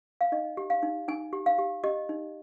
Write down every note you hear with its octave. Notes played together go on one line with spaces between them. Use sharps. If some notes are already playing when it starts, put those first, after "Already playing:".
F5
D#4 D#5
G4
F5
D#4
D#4 G#5
G4
F5
G4
G4 D#5
D#4